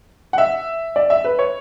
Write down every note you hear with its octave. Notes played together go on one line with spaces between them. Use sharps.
F#5
E5
D5
E5
B4
C#5